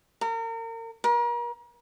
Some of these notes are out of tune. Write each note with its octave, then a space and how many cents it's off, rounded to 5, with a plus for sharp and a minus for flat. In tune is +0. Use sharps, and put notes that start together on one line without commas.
A#4 -35
A#4 +40